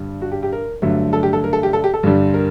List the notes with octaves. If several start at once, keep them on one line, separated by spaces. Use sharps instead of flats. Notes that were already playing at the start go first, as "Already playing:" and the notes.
Already playing: G2 D3 G3
F#4
G4
G4
A#4
G2 D3 F#3 A3
A4
G4
A4
A#4
A4
G4
A4
G4
A4
G2 D3 G3
A#4